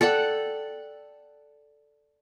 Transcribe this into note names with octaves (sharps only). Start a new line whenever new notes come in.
A4 D5 F#5 G5